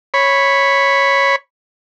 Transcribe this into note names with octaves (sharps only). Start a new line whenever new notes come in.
C#5 B5